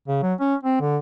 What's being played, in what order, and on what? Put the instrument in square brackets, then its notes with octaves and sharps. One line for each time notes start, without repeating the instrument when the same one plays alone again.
[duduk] C#3
F#3
C#4
C4
D3